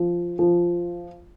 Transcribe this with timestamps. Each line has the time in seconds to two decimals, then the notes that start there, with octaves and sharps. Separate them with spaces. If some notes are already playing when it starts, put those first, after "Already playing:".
Already playing: F3
0.39 F3